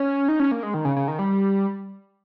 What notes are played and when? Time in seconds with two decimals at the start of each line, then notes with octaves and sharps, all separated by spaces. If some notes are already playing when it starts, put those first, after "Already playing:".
Already playing: C#4
0.28 D#4
0.40 C#4
0.52 A#3
0.63 G#3
0.74 D#3
0.85 C#3
0.96 C#3
1.08 D#3
1.19 G3